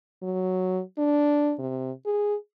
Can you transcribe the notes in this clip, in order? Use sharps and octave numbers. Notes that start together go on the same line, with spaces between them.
F#3
D4
C3
G#4